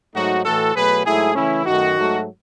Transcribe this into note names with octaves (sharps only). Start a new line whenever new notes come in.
G#2 F#3 A3 D#4 F#4
A2 E3 A3 F#4 A4
B2 F#3 A3 G#4 B4
G#2 F#3 A3 E4 G#4
C#3 E3 A3 C#4 E4
F#2 D#3 A3 D#4 F#4
G#2 F#3 A3